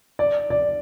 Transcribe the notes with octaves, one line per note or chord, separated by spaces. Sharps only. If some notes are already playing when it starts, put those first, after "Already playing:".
D5
D5